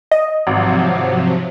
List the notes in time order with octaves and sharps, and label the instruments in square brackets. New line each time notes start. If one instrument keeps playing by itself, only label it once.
[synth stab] D#5
[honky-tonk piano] G#1 [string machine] C3 F3 F#3